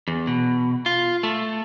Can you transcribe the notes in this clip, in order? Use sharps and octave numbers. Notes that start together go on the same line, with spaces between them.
E2
B2
F4
A3